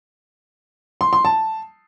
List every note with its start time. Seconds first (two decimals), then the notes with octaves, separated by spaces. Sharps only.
1.01 C6
1.13 C6
1.25 A5